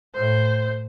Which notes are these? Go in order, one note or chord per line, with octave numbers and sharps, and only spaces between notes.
A2 C5